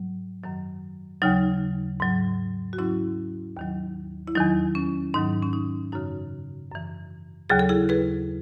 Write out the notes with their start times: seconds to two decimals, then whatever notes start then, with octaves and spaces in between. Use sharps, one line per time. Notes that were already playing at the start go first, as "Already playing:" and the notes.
Already playing: G#2 F#3
0.43 F#2 D#3 F#3
1.22 D#2 C#3 F#3 D#4
2.00 G#2 F#3
2.73 F#4
2.78 G#2 F#3 C#4 E4
3.57 D#2 D#3 F#3
4.28 E4
4.35 E2 D#3 F#3 D#4
4.75 C#4
5.14 G#2 D#3 F#3 D#4
5.43 C#4
5.53 D#4
5.92 F#2 C#3 E3 D#4 F#4
6.71 F#2 E3
7.50 D#2 C#3 F#3 G#4
7.59 A4
7.69 E4 G#4
7.89 G#4 B4